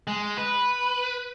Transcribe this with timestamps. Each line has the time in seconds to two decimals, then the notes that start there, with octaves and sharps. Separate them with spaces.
0.07 G#3
0.38 B4